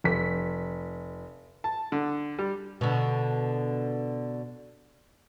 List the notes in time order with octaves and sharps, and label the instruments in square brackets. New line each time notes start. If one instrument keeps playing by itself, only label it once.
[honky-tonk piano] F1 B6
[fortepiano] A5
D3
G3
[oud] B2 D3